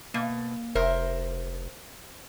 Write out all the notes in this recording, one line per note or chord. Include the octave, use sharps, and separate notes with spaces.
B2 A#3
F1 A#4 C5 E5